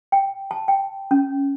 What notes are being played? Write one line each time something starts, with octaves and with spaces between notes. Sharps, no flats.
G5
A5
G5
C#4